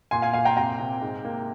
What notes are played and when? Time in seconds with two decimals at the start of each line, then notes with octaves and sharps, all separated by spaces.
0.11 A#2 G#5 C6
0.22 F5 G#5
0.33 A#2 F5 G#5
0.45 G5 A#5
0.57 C3 G5 A#5
0.79 C3
1.01 G#2
1.25 A#3